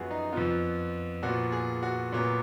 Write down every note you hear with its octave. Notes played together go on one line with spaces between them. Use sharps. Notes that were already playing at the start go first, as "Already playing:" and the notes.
Already playing: F#2 F3 B3 F#4 G#4
D#4
F2 F3 B3 F4
A#2 F3 B3 F#4
G#4
F#4
A#2 F#3 B3